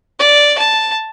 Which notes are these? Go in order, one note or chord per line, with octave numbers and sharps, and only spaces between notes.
D5
A5